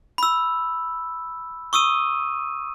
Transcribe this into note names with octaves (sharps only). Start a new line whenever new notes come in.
B5 E6
C#6 D#6 E6 D#7